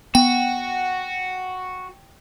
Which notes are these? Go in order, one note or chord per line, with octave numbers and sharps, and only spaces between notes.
B3 F#4 G5